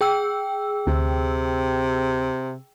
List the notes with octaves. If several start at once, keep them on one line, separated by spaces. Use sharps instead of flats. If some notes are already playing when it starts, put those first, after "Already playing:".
G#4 G5 E6
D2 C3